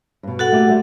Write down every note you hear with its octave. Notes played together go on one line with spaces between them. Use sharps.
G2 B2
F#4 A4 F#5
A3 A#3 G4
G3 A3 C5